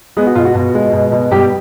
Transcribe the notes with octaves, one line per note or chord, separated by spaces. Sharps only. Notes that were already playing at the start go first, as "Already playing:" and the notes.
G#3 B3 G#4
F#4
B2 F4
F#4
B2
G#3
B2
B2
B2 G3 G4